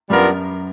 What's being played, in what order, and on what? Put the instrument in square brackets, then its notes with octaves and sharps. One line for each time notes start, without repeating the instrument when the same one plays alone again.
[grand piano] F#2 [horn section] G3 B3 D4 F4 A#4